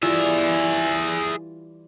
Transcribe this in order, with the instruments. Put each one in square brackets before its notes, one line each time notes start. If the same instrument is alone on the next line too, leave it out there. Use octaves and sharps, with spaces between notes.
[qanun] E3 G3 F4 [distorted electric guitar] G#4 E5